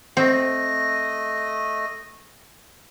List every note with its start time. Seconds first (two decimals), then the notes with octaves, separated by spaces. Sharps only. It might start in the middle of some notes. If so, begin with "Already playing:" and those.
0.17 A3 C4 D#5